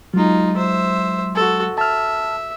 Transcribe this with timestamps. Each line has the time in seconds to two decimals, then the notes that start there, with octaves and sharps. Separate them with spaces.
0.14 F#3 G#3 D#4 F4
0.56 C5 E5
1.35 F#4 A4
1.78 E5 A5 F6